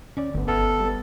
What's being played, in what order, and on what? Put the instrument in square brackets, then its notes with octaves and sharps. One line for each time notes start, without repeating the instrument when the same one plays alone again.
[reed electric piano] D2 D5 [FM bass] C#4
[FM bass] G1 [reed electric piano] D2 B3
[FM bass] G1 [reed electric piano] B3 E5 F6 [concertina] A4
[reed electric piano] G3 B3